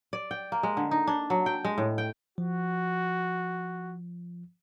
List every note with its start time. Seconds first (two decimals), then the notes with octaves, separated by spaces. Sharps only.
0.13 D5
0.31 G5
0.52 A#3
0.63 G#3
0.77 D3
0.91 D#4
1.07 D4
1.30 F#3
1.46 G5
1.65 G#3
1.78 A2
1.98 G5
2.38 F3 F#4